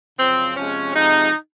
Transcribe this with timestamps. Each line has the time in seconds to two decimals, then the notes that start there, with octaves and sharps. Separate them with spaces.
0.18 F#2 C#3 F3 C4
0.56 C3 F3 G#3 C#4
0.93 C3 F3 G#3 D#4